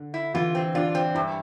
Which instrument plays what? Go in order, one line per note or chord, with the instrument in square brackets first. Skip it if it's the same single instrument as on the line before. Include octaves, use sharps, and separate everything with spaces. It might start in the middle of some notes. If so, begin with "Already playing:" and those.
Already playing: [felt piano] D3
[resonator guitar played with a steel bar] E4
[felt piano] E3 [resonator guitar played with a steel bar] F4
[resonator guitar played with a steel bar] C4
[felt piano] D4 [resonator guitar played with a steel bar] F4
[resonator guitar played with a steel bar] C4
[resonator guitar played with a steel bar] G2 [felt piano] E4